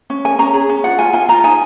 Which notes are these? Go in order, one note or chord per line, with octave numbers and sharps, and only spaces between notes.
C#4
A#4 G#5
C#4 A#5
G#4
C#4
F4 F#5
F4 G#5
F4 G#5
F4 A#5
D#4 G#5